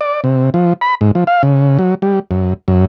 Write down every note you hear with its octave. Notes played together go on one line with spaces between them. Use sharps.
D5
C3
F3
B5
G#2
F3
F5
C#3
F#3
G3
F#2
F#2